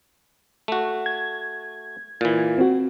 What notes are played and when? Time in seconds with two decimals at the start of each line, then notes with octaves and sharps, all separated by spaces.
0.68 A3 F#4
1.06 G#6
2.21 A#2 E3
2.58 C4 F#4